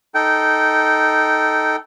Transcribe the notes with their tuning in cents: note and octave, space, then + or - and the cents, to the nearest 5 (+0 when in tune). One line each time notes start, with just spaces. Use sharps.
D#4 +0 A4 +0 G5 -20